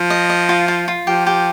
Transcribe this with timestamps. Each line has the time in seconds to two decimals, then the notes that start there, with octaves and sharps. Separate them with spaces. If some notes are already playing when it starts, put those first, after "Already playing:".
Already playing: F3
0.10 D#5
0.30 D#5
0.49 F4
0.68 F4
0.88 F4
1.07 F3 G4
1.27 G4